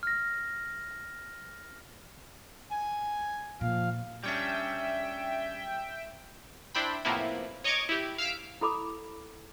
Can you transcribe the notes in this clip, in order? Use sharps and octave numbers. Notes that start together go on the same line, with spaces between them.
F6 A#6
G#5
A#2 F3 F5
G3 C#4 D4 E5 G5
D4 E4 C5 G5 B5
A2 C3 F3 A#3 B3 E4
C#5 D#5 A#5 C#6 D6 G#6
E4 G4
F5 E6 F6 B6 D7
E4 A4 B5 D6 D#6